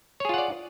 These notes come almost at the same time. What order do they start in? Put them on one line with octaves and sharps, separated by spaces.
C#5 G#4 F4 F#5 D5